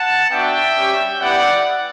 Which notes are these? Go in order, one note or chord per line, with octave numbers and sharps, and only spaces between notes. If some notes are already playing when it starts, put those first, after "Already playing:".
Already playing: F#5 A5
B3 D4 F#4 E5 G5
G3 C#4 G4
G3 B3 E4 G4 D5 F#5